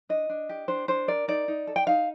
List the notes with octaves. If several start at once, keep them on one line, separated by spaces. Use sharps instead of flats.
D4 D#5
D4
G4
D4 C5
D4 C5
A#4 D5
D#4 D5
D#4
A4
G5
D#4 F5